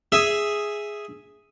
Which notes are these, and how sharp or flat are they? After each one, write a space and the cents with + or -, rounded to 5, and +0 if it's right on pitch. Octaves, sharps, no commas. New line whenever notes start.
G#4 +0 E5 +0